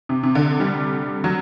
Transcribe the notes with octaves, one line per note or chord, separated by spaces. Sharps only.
C3
C3
D3
G3
F#3